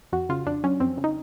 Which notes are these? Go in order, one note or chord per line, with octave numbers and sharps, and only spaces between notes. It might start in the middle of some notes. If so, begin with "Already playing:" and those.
F2 F#4
C#3 F4
F2 D4
F#3 C#4
F2 C4
C#3
D#4